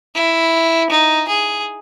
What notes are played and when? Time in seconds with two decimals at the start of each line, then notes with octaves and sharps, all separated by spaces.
0.15 E4
0.90 D#4
1.28 G#4